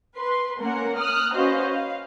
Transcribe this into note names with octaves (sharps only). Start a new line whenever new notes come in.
B4 C6
A#3 C#4 A#4 F#5
D#6 F6 F#6
C#4 F#4 B4 C5 D#5 F5
F5